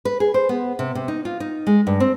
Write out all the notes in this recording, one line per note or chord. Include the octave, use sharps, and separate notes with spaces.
B4
G#4
C5
B3
C3
C3
D#4
F4
D#4
G#3
G2
C4